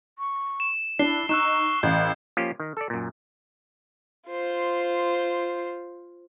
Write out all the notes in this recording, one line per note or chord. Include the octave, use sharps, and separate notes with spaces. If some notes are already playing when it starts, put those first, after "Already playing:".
C#6
E7
D4 E4 C7 G7
D#4 C#6 E6 F#6 E7
A1 F5 G6
F3 A#3 C#4 F4 G4
D#3
A4 D5
F#2 A#2
F4 C5